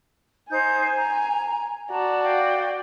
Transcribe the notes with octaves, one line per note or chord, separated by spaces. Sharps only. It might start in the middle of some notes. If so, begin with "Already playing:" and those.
D#4 C5 G#5 G6
A#5
F#4 D5 A5 A#5
F5 G5